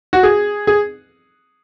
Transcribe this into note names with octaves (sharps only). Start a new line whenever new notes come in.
F#4
G#4
G#4